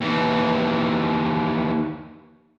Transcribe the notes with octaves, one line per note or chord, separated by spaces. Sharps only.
D#2 E3